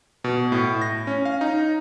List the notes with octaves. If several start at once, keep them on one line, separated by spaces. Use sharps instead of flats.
B2
A2
A#6
C#4
F5
D#4